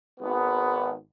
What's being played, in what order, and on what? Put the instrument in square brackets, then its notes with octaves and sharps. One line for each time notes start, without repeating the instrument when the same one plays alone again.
[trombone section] G#1 B3